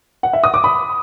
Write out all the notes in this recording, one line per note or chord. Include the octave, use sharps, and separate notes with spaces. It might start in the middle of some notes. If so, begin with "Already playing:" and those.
F#5
E5
D#6
D6
B5